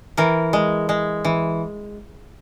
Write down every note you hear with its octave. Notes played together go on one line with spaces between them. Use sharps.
E3 A#4
G#3
G#3
E3